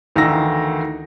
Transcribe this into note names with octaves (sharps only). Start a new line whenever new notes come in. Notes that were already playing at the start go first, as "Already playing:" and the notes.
D2 D#3 E3 F5 E6 A#6